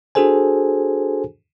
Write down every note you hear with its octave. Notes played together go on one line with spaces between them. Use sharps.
D4 F#4 G#4 A4 C5 G#5